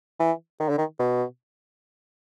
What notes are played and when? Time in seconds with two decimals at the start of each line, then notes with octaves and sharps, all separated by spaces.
0.20 E3
0.60 D#3
0.69 D3
0.78 D#3
0.99 B2